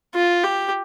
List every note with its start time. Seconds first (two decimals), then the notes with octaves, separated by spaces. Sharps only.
0.15 F4
0.44 G4